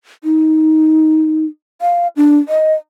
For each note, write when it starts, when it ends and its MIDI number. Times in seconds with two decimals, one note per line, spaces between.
0.24 1.45 63
1.81 2.07 77
2.17 2.38 62
2.48 2.73 75